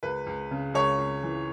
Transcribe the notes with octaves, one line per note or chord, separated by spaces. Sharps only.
C#2 B4
C#2
C#3
C#2 C#5
C#2
E3